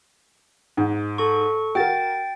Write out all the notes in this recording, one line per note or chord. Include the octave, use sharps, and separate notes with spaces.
G#2
A4 C#6
F#4 A#4 G5 A6